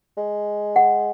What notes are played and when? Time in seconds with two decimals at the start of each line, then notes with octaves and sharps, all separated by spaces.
0.18 G#3
0.76 F#5